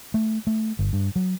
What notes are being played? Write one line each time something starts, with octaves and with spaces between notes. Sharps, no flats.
A3
A3
G1
G2
F#3